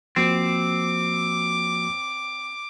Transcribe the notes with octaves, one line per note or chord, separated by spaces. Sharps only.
F3 A#3 C4 F#4 D6